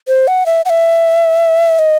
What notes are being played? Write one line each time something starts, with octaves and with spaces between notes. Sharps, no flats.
C5
F#5
E5
F#5
E5
D#5